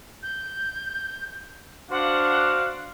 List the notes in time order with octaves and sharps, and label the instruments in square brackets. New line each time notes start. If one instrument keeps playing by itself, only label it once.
[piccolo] G6
[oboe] D4 [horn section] F#4 C5 F5 [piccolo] F#5